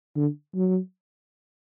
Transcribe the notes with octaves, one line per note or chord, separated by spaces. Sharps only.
D3
F#3